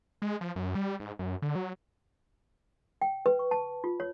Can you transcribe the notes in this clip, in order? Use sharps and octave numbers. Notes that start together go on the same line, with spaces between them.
G#3
F3
F#2
G3
G#2
F#2
D3
F#3
G5
B4
C#6
A5
F4
C#5